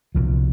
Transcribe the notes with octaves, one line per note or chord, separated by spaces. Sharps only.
C2 A#2 F3